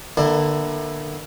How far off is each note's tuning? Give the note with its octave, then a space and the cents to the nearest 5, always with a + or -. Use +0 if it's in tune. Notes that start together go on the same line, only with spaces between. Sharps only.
D3 +30 A#3 +40 E4 +0